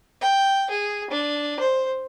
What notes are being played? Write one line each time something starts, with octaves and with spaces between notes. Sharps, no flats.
G5
G#4
D4
C5